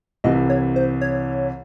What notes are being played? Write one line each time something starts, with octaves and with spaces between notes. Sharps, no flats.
C2 C3 E3 D#5
C#5
C5
C#5